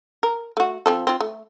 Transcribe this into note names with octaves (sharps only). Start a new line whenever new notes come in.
A#4
A3 F#4
F3 C4 A4
C4 F4
A3